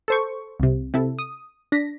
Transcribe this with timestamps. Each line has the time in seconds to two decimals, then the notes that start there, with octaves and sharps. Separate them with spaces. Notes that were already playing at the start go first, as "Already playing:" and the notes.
0.08 A4 C5 C#6
0.60 C2 C3
0.94 C3 E4 A4
1.19 D#6
1.72 D4 A#6 B6